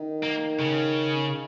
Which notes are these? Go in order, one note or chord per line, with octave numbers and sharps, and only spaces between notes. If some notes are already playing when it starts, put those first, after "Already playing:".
Already playing: D#3
A#3
C#3